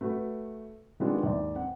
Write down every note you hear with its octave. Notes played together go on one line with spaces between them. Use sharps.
A3 F#4 B4
D#3 G#3 B3 C4 D4 F4
D#2 G#2 D5
C4 F#5